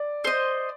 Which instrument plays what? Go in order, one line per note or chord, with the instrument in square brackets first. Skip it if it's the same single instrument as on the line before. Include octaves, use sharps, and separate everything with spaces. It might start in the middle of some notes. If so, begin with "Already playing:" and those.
Already playing: [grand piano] D5
[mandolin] C5 D#5